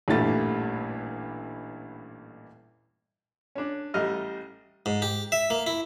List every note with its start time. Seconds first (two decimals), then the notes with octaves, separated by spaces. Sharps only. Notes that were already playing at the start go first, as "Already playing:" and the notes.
0.08 A1 G2 A#2 G3 A3 A6
3.56 C#4 D4
3.94 A1 G3 D#5 F6
4.86 G#2
5.02 G4
5.32 E5
5.50 A#3
5.67 E4